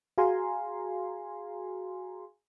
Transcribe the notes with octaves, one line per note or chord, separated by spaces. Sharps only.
F#4 G#4 F5 G#5 A#5 C6